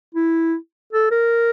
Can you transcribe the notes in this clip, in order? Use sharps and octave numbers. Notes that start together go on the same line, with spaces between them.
E4
A4
A#4